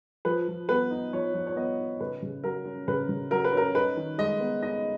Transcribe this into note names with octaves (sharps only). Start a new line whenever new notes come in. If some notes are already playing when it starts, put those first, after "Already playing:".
F3 B4
F3
B3 B4
D#4
F3 C#5
F3
C#5
B3 D#5
D#4
C#3 B4
C#3
F#3 A#4
C#4
C#3 B4
C#3
F#3 A#4
B4
C#4 A#4
D#4 B4
D#3
G#3 D#5
B3
D#4 D#5